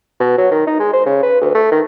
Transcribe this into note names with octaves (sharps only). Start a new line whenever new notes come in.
B2
F#3
D#3
D#4
G#3
C5
C#3
B4
D2
A3
D#3